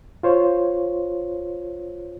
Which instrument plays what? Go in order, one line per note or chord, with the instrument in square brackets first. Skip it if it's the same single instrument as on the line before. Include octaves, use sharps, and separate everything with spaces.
[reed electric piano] F4 C5 C#5